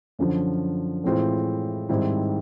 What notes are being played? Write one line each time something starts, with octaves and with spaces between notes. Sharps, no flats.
F#2 D3 F3
A2 E3 G#3 C4 F4
G#2 D#3 G3 C4 E4